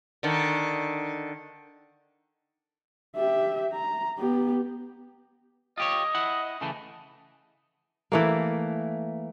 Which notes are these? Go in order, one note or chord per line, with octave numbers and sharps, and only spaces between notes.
D3 D#3
G4 E5
A#5
B3 G4
F4 G4 C#5 D#5
E4 F#5
C#3 E3 A3
E3 A3 A#3